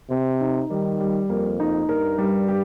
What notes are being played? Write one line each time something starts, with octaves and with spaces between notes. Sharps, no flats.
C3 C4
D#4
D#3 G3
G3
F2 A#3
D#4
G2 A#4
G3
G4